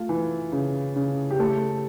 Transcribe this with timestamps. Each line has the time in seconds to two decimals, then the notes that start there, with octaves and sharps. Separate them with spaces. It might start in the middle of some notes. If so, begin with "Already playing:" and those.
Already playing: A3 F4
0.09 E3
0.52 C#3
0.96 C#3
1.30 G4
1.39 A3 A4